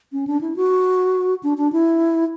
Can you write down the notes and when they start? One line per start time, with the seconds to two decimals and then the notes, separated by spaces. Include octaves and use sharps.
0.12 C#4
0.27 D4
0.41 E4
0.56 F#4
1.43 D4
1.58 D4
1.72 E4